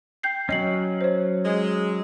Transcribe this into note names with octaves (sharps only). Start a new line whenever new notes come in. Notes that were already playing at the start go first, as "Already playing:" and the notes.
G5 G6 C7
F#3 C#4 D#5 C7 F#7
C5 C#5
G#3